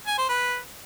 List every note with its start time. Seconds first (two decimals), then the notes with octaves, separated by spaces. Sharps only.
0.07 G#5
0.18 C5
0.29 B4